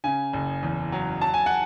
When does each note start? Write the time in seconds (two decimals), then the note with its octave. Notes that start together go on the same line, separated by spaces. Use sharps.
0.04 C#3 G#5
0.33 F#1
0.63 E2
0.92 F#3
1.21 F#3 A5
1.34 G#5
1.46 F#5